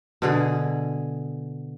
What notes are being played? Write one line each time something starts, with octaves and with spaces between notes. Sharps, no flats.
B2 D3 G#4